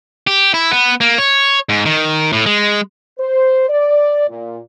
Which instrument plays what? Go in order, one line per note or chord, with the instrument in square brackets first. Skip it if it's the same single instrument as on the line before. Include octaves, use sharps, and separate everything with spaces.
[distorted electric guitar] G4
E4
B3
A#3
C#5
G#2
D#3
A2
G#3
[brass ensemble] C5
D5
A#2